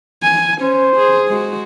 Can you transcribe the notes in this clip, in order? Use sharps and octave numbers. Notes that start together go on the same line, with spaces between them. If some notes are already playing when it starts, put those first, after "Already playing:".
G#5
C#4 C5
G#4
G#3 F#4